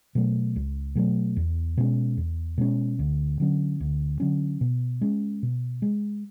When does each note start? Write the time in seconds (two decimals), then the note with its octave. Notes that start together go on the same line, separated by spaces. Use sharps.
0.15 B2 F#3 A3
0.56 C#2
0.95 B2 F#3 A3
1.37 E2
1.77 B2 G#3 C#4
2.17 E2
2.58 B2 G#3 C#4
2.99 D2
3.40 D3 F#3 C#4
3.80 D2
4.20 D3 F#3 C#4
4.61 B2
5.01 G#3 C#4
5.43 B2
5.82 G#3